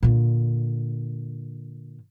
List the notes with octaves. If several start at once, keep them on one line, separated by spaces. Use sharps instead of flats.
A#2 D3